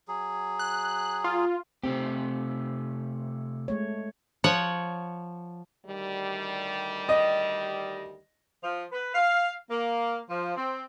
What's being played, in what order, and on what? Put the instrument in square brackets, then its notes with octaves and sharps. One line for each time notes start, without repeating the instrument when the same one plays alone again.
[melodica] F#3 G#4
[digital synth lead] F#6
F4
[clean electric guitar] C3 A3 G4 [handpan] C4
[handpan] G#3 A3 C#5
[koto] F3 C#5 F#5
[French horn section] D2 D#3 G3
[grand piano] D#5
[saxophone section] F3
B4
F5
A#3
F3
C4